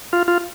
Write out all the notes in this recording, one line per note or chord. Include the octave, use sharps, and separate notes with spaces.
F4
F4